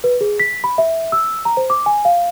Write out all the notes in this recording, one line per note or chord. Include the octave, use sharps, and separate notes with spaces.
B4
G#4
B6
B5
E5
E6
A#5
C5
D6
G#5
F5